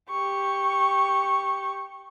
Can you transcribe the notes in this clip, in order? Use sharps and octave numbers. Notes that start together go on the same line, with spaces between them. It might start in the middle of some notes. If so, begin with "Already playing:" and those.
G4 C#6